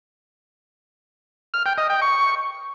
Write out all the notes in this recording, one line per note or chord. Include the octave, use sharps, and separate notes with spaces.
F6
G5
D#5
G5
C#6